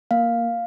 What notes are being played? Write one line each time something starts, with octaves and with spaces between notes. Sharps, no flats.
A#3 F5